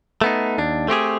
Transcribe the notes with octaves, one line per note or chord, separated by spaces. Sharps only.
A3 B3 D#4
D#2 D4
A3 C4 G4 G#4